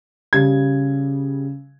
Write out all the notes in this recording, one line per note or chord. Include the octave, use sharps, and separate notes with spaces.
C#3 G3 G#6